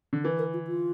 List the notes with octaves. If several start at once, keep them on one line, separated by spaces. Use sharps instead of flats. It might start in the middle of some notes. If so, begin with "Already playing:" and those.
D3
E3 A#4
A#4
F4
F4